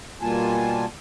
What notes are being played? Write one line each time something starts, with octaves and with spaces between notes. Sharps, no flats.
B2 G3 A#3 F4 G#5 A5